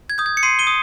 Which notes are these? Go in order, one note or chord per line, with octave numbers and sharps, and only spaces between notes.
G#6
D#6 G6
G#6
C#7
C6 C7 D#7
D#7 G7
D#6